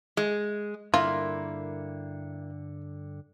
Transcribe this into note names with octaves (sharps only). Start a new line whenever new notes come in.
G#3
G2 D3 A#3 E4 F4 A#4